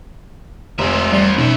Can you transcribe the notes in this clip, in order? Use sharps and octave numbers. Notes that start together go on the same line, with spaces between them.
F1 G#3 E5
E2 G3 D5
E2 B2 C#4 D#4 E5